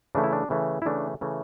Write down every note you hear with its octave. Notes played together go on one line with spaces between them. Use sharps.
C#3 E3 A3 D4
E4
D4
C#3 E3 A3
E4
C#3 E3 A3 D4
C#3 E3 A3